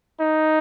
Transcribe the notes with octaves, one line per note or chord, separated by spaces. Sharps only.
D#4